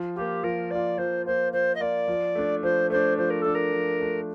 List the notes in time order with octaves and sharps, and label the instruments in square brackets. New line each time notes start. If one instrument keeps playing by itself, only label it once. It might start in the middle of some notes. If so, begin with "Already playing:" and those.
Already playing: [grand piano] F3
[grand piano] A#3 F4 [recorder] G4
[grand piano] F3 [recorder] A#4
[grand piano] A#3 F4 [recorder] D5
[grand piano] F3 [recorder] C5
[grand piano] A#3 F4 [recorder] C5
[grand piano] F3 [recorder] C5
[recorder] D#5
[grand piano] A#3 F4 [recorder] D5
[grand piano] F3
A3 D4
[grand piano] F3 [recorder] C5
[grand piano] A3 D4 [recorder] C5
[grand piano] F3 [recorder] C5
[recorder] A#4
[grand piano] A3 D4 [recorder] A4
[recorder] A#4
[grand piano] F3
A3 D4